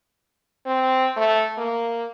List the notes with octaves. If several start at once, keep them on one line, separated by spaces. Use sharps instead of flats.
C4
A3
A#3